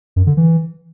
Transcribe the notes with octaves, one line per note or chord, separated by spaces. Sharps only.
F#2
D3
E3